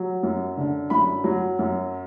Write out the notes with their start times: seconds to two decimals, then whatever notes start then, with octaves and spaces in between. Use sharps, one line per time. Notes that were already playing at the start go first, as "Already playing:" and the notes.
Already playing: F#3
0.23 F#2
0.57 D3
0.90 F#2 B5
1.24 F#3
1.59 F#2